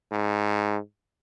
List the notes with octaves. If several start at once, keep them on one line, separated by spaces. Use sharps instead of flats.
G#2